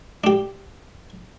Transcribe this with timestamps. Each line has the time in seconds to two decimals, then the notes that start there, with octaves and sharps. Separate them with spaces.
0.24 D4 G4